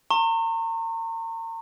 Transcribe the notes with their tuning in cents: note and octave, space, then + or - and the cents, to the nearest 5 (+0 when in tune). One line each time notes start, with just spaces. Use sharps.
A#5 -35 C#6 -45